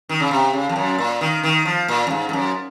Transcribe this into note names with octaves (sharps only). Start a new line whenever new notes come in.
D#3
C#3
C3
C#3
F2
F#2
A#2
D#3
D#3
F3
A#2
F#2
G#2
G#2
F#2